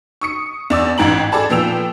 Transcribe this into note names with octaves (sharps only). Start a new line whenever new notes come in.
C#6 D#6 C#7
E2 D5 E6
A1 G#2 E3 G5 A#5 F#7
G#4 A4 D5 A5 B5
A#2 F3 B3 G5 E6 F7